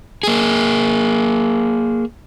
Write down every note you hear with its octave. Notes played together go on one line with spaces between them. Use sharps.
A#3 G#4